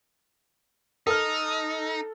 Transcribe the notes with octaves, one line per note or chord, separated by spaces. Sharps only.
D#4 A4 F6